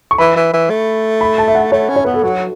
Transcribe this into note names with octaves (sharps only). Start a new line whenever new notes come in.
C#6
E3 B5
E3
E3
A3
B5
A5
E5
F#5
A3 C#5
C#4
C#5
B3 B4
A4
F#3 F#4